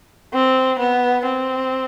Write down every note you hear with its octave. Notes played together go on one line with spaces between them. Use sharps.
C4
B3
C4